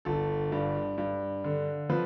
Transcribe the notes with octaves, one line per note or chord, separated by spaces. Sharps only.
G1 A4
G2
G2
D3
F3 B4